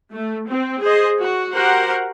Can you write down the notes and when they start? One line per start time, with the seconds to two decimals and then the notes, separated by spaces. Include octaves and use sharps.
0.12 A3
0.49 C4
0.81 G#4 C5 D#5
1.19 F#4
1.53 F#4 G4 A#4 C5 F#5